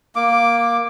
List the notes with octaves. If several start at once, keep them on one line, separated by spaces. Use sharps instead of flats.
A#3 D6